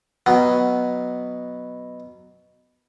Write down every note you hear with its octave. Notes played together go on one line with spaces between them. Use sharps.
B2 F#3 B3